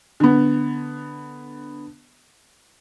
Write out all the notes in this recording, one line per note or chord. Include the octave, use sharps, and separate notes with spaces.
D3 B3